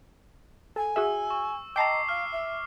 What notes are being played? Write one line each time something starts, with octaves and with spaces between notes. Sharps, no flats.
A4 G#5
F#4 G#4 E5 E6
C#6
D#5 G5 A5 A#5 D6 C7
F5 F6
E5